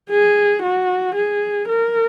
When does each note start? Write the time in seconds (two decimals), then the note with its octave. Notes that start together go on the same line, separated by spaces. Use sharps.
0.10 G#4
0.62 F#4
1.15 G#4
1.68 A#4